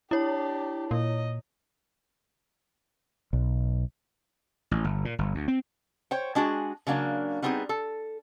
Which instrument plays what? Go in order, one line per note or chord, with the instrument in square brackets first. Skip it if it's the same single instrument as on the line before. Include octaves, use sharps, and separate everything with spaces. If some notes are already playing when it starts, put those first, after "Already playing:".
[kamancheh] D4 G4 [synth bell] E4 C#5
[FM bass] A#2 [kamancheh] D#5
[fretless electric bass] B1
[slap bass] A1
G1
A#2
G1
D2
C4
[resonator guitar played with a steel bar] C5 C#5 G5
G#3 D4 F#4 G#4
C#3 F#3 A#3 D4
G3 B3 C4 D#4 F4 G#4
A4